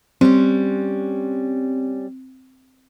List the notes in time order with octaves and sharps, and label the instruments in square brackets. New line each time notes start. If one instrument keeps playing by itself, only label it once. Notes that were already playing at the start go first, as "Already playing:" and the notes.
[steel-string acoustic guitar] G3 C#4 [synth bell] C4